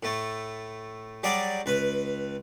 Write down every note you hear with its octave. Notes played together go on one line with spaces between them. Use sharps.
A2 A3
F#3 G3 G#4 D5 D6
C#2 B4